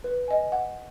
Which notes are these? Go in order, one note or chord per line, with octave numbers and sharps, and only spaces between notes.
B4
D#5 G#5
F#5